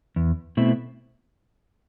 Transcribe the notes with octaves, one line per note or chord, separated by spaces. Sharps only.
E2
B2 A3 C4 E4